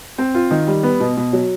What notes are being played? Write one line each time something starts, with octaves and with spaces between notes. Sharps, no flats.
C4
F4
D#3
G3
B3
B2
B2
F#3